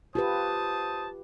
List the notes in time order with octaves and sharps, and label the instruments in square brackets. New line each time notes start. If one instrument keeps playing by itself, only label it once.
[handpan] F4 G4 B4 [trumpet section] C5 A5 D#6